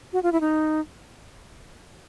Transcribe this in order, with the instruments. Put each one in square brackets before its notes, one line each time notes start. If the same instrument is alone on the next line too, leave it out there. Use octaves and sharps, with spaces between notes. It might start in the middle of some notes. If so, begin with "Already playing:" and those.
[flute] F#4
F4
E4
D#4